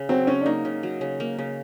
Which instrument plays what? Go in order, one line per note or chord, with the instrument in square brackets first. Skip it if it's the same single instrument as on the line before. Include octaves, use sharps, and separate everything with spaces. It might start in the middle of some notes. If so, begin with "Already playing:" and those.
Already playing: [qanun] C#3
[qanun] F#3 [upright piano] C4
[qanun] C#3 [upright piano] C#4
[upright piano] D4
[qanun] A#3 [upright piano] D#4
[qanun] C#3
F#3
C#3
A#3
C#3